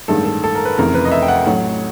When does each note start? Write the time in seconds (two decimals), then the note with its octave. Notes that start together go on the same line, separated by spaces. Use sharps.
0.08 A1 G2 D#3 G#3 A4
0.25 A4
0.44 A4
0.55 A#4
0.65 B4
0.78 F1 F2 C#3 E3 A#4
0.95 B4
1.05 D#5
1.11 E5
1.22 G5
1.28 F#5
1.46 A1 A2 F#3 F#5